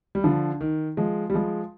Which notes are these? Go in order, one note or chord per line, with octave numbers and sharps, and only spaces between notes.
G3
D3 F3
D#3
F3 G#3
G3
F3 G#3